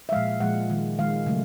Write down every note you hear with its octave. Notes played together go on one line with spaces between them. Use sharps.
E5
A#2 F3 G#3 F5
A#2 F3 G#3 F#5
D#3 G#3
D#3 G#3 F5
C#3 F#3 A3